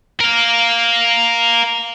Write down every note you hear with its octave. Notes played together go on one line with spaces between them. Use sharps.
A#4 F5